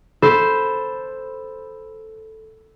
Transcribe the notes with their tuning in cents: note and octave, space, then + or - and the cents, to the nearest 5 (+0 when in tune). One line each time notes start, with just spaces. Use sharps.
A4 +0 C5 +0 B5 +0